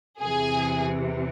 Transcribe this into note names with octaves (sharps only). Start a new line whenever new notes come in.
E2 C3 E3 G#4